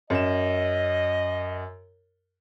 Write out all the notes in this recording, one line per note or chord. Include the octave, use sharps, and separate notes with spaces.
F#2 D#5 E7